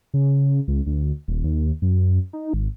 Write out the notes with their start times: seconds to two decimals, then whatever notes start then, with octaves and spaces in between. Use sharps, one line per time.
0.14 C#3
0.68 C#2
0.87 D2
1.28 D#1
1.44 D#2
1.82 F#2
2.33 D#4
2.54 G#1